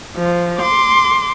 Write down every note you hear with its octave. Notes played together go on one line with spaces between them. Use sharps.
F3
C6 D6